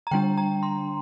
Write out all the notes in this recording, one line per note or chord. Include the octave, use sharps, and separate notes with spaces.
A#5
D3 G3 D4 G5
A#5
C6